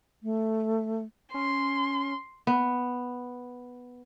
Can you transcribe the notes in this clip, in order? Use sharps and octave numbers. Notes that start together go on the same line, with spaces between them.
A3
C#4 C6
B3